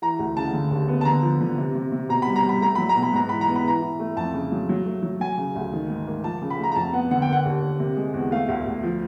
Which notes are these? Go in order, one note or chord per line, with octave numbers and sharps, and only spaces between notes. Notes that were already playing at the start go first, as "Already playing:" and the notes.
E3 A#5
D2
C#3 A5
D3
D#2
B3
A5
D3 A#5
F3
D3
C3
C3
C3
B2 A#5
G3 B5
A#5
G3
B5
A3 A#5
F#3 B5
A#5
B2
B5
G#2 A#5
E3 B5
A#5
B3
B5
E3 A#5
E3
A3
F2 A5
C#3
F#3
F#3
A3
F#3
F#3 G#5
C#3
D2
D#3
G#2
A#3
F3 A5
C#3
B5
A3 A#5
A#5
F2 A5
B3 F#5
D3 F#5
G5
A#3
F#5
D#2
A#3
C3
G#3
E2
A3 F5
D2
D2
F3